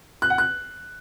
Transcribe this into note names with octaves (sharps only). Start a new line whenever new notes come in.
F#6
F#5
F#6